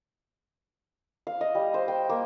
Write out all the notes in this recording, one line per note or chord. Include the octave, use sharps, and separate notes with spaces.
F5
D#5
G3
C5
G5
A#3